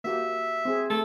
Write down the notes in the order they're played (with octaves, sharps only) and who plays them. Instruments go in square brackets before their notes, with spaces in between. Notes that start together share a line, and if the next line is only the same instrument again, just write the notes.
[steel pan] A#3 F#4 G4 [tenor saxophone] E5
[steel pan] C4 G#4
[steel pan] A3 [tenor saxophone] A4